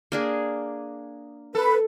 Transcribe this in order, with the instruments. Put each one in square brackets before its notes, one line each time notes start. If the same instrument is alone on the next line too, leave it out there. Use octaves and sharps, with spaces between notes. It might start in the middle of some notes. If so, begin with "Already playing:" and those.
[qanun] A#3 D4 G#4
[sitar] A4 [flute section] B4